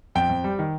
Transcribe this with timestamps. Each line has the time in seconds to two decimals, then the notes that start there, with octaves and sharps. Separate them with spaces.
0.15 F2 G5
0.29 F2
0.44 G3
0.59 D#3